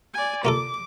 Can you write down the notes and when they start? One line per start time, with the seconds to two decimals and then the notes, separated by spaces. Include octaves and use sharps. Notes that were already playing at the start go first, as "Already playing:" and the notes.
0.14 D5 G#5
0.45 A#3 F4 A4 D6